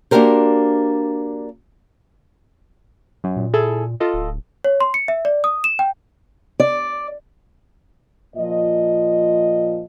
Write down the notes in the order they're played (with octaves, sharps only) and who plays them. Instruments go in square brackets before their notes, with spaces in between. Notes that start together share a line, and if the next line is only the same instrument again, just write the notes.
[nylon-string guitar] A#3 D4 F#4 G4 A#4 C5
[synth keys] F#2
[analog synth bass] A#2
[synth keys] E4 G#4 A4
F4 A4 D#5
[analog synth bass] D1
[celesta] C#5
C6
C#7
E5
D5
D#6
E7
G5
[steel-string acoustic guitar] D5
[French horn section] A#2 F3 D#5